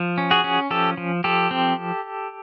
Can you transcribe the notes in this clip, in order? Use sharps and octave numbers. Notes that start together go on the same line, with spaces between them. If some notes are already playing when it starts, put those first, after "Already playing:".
Already playing: F3
C#4
F#4 G#4
C#4
F3 G4 A4
F3
F3 G4 A4
C4